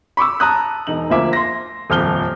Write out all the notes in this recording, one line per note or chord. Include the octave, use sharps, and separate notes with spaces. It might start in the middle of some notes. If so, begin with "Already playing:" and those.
B5 C#6 D6 E6
A5 A#5 D#6 F#6
E1 D#4 F#7
D2 F3 A#3 E5 G#5 D6
C6 A#6
D#1 F2 F6 G7